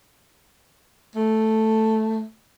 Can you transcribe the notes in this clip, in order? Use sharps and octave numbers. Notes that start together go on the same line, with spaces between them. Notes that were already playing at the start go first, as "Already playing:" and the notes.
A3